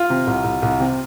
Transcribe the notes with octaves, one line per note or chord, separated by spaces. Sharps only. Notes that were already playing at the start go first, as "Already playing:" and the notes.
Already playing: F4
C3
C2
C2
C2
C3